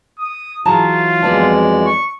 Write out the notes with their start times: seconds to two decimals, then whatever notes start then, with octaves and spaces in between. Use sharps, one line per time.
0.19 D#6
0.65 E3 F#3 F4 G#4 A5 A#5
1.22 F2 E3 F#3 G#3 B3 D5 A5
1.86 C#6